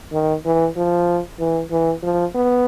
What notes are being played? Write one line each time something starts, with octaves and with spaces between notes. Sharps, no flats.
D#3
E3
F3
E3
E3
F3
B3